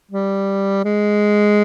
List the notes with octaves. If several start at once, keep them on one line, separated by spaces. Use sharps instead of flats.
G3
G#3